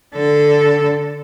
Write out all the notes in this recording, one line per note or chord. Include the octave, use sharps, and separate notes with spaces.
D3 A4